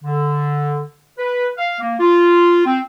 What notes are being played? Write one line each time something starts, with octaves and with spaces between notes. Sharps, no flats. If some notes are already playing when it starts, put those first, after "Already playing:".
D3
B4
F5
A#3
F4
C4